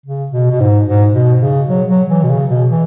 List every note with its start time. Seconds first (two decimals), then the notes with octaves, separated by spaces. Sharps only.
0.06 C#3
0.32 B2
0.51 B2
0.60 G#2
0.86 G#2
1.14 B2
1.41 C#3
1.68 F#3
1.89 F#3
2.09 E3
2.23 B2
2.30 C#3
2.49 B2
2.70 E3